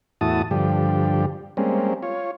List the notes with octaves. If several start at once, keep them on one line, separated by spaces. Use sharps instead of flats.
E2 A2 E4 F#4 A5 D#6
G2 D3 F3 G4
G3 G#3 A#3 C4 C#4
F4 C#5